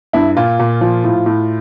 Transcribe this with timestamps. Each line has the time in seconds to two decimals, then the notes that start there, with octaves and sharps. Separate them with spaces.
0.13 G2 E4
0.37 A#2 F4
0.60 A#2
0.81 F3
1.04 A2
1.26 A2